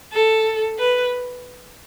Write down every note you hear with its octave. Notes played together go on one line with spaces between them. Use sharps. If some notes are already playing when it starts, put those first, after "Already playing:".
A4
B4